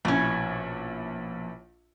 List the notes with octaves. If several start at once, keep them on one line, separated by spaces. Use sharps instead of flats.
A#1 B2 C#4 E4